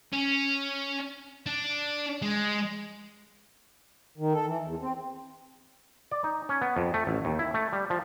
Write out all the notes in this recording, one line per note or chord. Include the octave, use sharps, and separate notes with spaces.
C#4
D4
G#3
D#3
A4
E3
E2
C4
D5
D#4
C#4
B3
F2
A3
A1
D#2
E4
A3
G3
F3